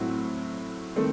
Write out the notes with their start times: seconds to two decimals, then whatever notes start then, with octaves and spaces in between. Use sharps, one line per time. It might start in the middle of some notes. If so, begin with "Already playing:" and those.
Already playing: A2 F#3 C4 F#4
0.96 D#3 A3 C4